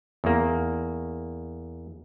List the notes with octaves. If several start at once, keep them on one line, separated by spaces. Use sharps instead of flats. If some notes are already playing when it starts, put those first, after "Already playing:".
E2 A#3